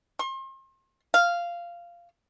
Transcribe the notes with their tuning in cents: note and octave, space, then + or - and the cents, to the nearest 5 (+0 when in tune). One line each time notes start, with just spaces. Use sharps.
C6 +40
F5 -10